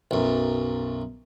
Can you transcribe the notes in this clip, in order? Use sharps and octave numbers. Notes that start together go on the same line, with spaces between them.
B1 F#2